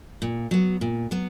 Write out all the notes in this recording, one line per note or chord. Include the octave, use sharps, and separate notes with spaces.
A#2
F#3 B3
A#2
F#3 B3